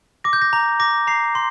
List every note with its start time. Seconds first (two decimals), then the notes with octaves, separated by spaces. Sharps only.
0.24 D6 A#6
0.33 G6
0.42 A#6
0.53 A#5
0.80 D6 A#6
1.07 A#5 C7
1.35 C6